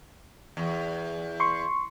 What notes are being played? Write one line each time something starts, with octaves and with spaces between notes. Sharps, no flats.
E2
C6 C#6